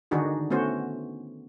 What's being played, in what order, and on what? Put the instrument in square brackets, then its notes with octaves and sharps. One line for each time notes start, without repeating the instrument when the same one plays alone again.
[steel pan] D3 D#3 D4 D#4 F#4 G#4
A3 B3 C#4 F#4 C5